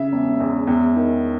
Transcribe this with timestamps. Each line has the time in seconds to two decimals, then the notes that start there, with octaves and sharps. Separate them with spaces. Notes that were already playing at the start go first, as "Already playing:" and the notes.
Already playing: C#3 E5
0.12 E1
0.40 E2
0.67 E2
0.96 D#3